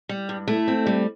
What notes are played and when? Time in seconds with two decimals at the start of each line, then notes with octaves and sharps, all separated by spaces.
0.09 G3
0.29 G2
0.48 A3 E4
0.68 C4
0.87 G3